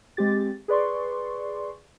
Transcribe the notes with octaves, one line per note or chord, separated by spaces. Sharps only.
G#3 C4 G4 A6
G#4 B4 D5 C6 C#6